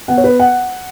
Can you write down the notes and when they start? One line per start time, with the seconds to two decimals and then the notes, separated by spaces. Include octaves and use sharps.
0.08 B3 F#5
0.18 C#5
0.24 B4
0.39 F#5